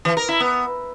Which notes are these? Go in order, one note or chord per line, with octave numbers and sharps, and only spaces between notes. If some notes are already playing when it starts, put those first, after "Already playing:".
E3
A#4
E4
B3